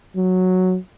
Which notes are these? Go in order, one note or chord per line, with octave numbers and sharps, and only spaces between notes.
F#3